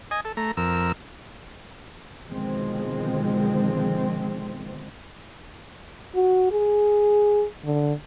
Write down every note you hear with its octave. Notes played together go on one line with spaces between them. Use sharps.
D#5 G#5
A4
A3 A#5
F2 A#4 E6
B2 D3 D#3 F3 G#3 C4
F#4
G#4
D3